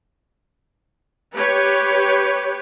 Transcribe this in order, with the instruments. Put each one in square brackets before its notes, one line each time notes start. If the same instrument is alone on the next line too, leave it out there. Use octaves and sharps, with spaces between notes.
[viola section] G4 B4 C#5